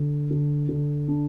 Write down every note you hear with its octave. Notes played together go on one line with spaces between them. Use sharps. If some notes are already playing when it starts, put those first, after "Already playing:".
Already playing: D3
D3
D3
D4